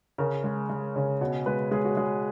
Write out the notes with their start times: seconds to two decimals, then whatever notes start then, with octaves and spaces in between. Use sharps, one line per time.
0.18 C#3 A#4
0.44 G#3
0.70 G#3
0.96 C#3
1.21 B2 C#5
1.46 G#3 B4
1.71 G#3 G#4
1.85 F#4
1.97 G#3 G#4